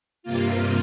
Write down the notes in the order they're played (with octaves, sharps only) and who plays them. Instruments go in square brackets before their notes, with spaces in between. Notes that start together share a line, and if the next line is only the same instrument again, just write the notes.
[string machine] G2 C3 A#3 F4